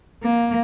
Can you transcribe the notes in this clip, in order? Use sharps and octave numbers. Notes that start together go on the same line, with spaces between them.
A#3